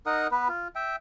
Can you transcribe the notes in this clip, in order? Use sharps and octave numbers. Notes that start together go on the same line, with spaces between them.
D#4 A#4 F#5 D#6
B3 B4
F4
E5 G5